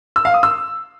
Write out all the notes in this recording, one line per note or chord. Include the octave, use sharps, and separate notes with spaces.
E6
F5
D#6
E6